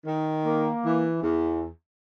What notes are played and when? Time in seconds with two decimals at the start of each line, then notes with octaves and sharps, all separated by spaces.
0.05 D#3
0.44 A#3
0.83 E3
1.22 E2